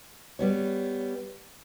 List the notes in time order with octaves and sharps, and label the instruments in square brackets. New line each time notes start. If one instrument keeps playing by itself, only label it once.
[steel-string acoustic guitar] G3 B3 C#5